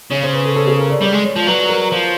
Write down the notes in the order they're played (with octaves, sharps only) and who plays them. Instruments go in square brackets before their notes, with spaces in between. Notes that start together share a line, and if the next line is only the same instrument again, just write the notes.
[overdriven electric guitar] C#3 [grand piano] C#5
[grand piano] C5
B4
A4
A4
G#4
A#4
D5
[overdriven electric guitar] G3 [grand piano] D5
[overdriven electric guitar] G#3
[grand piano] C#5
[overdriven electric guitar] F3
[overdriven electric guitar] F#3 [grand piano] B4
[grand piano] A#4
[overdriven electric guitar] F3